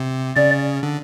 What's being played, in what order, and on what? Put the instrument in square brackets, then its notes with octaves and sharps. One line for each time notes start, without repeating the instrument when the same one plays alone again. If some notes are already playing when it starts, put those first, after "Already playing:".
Already playing: [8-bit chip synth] C3
[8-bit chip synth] C#3 [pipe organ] D5
[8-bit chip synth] D3